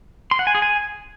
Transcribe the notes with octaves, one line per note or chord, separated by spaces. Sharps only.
C6
F#5
G#5
G#4
G#5